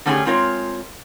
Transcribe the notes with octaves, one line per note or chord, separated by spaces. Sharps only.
D3 A3 C#4 F4 G4 G#4
G#3 C4 F4 A#4 C#5